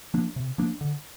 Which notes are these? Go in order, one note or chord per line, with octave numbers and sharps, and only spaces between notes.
F3 A#3 D4
C3
F3 A#3 D4
D3